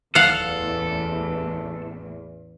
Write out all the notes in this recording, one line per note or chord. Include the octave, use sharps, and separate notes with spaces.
D1 A1 E2 A4 F5 F#5